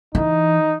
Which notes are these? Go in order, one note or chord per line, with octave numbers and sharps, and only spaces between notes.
E3 D#4